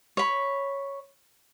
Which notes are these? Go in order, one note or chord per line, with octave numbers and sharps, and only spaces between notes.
C#5 B5